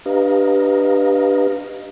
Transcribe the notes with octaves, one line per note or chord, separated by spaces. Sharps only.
D4 G4 B4 D#5 F5 A#5